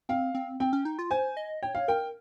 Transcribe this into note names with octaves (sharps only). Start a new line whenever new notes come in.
C4 F5
C4
C4 G5
C#4
D#4
F4
C5 G#5
D#5
C#5 G5
F5
A#4 G5